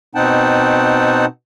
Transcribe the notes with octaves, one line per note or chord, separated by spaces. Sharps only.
B2 C4 D#4 F#5 G5 A5